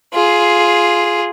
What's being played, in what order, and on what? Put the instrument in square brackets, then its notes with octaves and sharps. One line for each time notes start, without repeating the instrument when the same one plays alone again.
[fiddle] F4 G#4